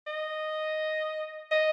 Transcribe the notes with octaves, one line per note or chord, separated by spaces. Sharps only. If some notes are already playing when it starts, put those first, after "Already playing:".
D#5
D#5